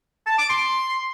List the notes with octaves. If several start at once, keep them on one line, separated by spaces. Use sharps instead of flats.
A5
D6
C6